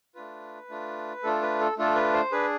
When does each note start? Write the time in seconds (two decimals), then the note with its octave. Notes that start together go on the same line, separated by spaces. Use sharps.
0.15 A3 D4 F4 B4
0.69 A3 D4 F4
1.23 A3 D4 F4 A4
1.42 B4
1.60 A4
1.78 A3 D4 F4 A4
1.96 B4
2.13 C5
2.32 D4 G#4 B4